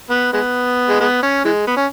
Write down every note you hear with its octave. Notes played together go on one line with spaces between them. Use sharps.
B3
G#3 B3
G#3
G#3 B3
C#4
E3 G#3
B3
C#4